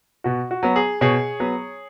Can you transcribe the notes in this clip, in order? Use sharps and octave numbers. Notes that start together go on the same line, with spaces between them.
B2 F#4
F#4
F#3 B3
G#4
B2 G#4 C#5
F#3 B3